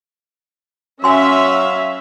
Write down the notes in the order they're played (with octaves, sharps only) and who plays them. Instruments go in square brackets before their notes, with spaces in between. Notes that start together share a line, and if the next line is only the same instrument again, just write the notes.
[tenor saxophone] F#3 [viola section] C#4 E5 F5 [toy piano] G#5 C6